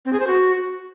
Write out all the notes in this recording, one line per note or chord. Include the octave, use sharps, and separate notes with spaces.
C4
G#4
C5
F#4